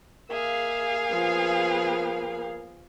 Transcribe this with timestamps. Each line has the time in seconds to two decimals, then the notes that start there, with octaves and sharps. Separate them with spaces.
0.30 A#3 G#4 E5 F5
1.11 F3 B3